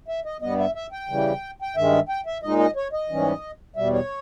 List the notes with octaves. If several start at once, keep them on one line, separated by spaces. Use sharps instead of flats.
E5
D#5
G2 G3 B3 D#5
E5
E5
G5
C#3 E3 G3
G5
G2 D#3 G#3 E5
G5
E5
A#2 G#3 D#4 D#5
D#5
C#5
D#5
G#2 E3 G3 C#4
E2 B2 G3 E5
C#5